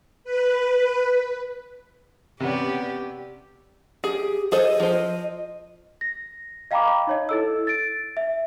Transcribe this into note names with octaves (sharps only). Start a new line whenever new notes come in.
B4
C3 B3 C#4 G4 D5
G4 G#4
G#4 A4 C5 D#5
F3 C5
A#6
D#5 F5 G5 A#5 B5 D6
D#4 C#5 D#5
E4 A4 E6
A6 D7
E5